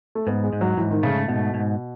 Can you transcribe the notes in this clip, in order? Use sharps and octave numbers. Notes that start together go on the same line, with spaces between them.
A3
G#2 B3
G#3
G#2
F#3
G#2 E3
D#3
C#3 A3
G#2 B2
G#2